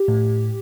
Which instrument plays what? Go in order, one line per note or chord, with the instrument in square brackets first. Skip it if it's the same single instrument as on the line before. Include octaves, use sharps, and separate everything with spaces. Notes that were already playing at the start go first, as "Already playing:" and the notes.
Already playing: [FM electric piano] G4
A2